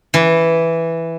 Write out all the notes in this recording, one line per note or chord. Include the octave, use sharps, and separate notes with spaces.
E3